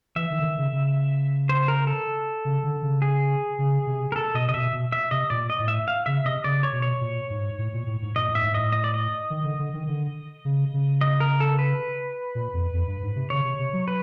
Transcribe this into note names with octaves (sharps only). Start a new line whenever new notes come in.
E3 E5
D#3
D3
D#3
C#3
C#3
C5
A#4
A4
C#3
D3
C#3
G#4
C#3
C3
A#4
A4
B2 D#5
C3 D#5
B2 E5
B2
E5
C3 D#5
A#2 D5
D#5
A2
E5
F5
C#3 E5
C3 D#5
C#3 D5
C#5
B2
C#5
A#2
G#2
A2
A#2
A2
G#2
A#2 D#5
A2
E5
G#2
A2 D#5
D#5
D5
D#5
D#3
D3
D3
D#3
D3
C#3
C#3
D#5
A#4
A4
B4
A#2
F2
F2
G2
G#2
C3
C#3 C#5
C3
C3
F#3
B4